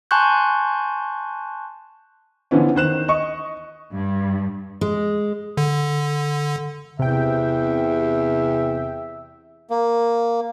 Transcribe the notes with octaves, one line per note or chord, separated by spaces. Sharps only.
G#5 A5 C6 C#6 F#6 G6
D3 E3 F3 B3 C#4
D#3 C5 F#6 E7
D#5 C#6
G2
G#3
D3
E2 C3 E5 G5
A#3